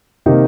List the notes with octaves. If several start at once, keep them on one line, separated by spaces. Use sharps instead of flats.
C3 D#3 A#3 D#4 G4